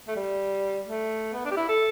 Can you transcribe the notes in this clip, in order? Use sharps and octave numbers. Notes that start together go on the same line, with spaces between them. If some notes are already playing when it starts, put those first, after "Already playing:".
A3
G3
A3
B3
D4
G4
E4
A4